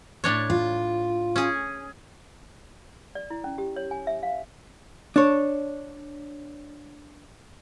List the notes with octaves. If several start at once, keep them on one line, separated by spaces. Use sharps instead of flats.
A2 D4 C#5
F4
C#4 G#4
D5
E4
C#4
G4
C#5
G#5
E5
F5
D4 C#5